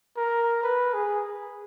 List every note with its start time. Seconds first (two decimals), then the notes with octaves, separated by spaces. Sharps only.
0.17 A#4
0.63 B4
0.93 G#4